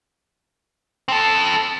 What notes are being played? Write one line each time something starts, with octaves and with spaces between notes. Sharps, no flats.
C4 A4